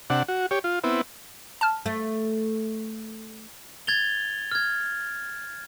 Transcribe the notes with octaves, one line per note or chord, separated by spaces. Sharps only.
C3 D4 F#5
F#4
G4 C#5
F4
B3 C4 E4
A5 F6
A3
G#6 A6 F7 G7
F6 G#6